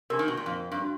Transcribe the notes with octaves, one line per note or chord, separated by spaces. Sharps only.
C3 D4 G4 A#4
D#3
B2
A#2
F2
G2
F#4